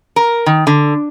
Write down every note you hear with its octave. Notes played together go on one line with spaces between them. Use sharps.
A#4
D#3
D3